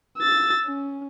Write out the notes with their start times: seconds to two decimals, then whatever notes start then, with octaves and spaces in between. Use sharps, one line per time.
0.18 E6 A6
0.66 C#4